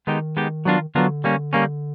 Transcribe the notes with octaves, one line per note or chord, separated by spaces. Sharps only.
D#3 G#3 B3 D#4 G4
G#3 B3 D#4 G4
F#3 B3 D4 F4 A#4
D3 F#3 B3 D4 F4 A#4
G3 A#3 C#4
G3 A#3 C#4